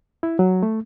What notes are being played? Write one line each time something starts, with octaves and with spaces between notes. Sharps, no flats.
E4
F#3
A3